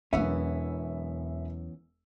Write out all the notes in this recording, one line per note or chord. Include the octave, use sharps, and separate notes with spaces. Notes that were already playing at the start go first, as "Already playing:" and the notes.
E1 E2 E3 F#3 B3 C#4 E5